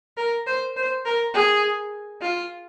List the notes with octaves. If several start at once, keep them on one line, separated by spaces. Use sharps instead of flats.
A#4
C5
C5
A#4
G#4
F4